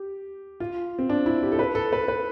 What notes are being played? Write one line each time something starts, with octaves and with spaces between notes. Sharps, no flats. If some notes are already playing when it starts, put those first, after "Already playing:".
Already playing: G4
F4
C4
D4
E4
G4
A4
B4
A4
B4
B4